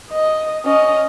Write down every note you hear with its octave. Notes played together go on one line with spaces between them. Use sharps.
D#5
C#4 D#5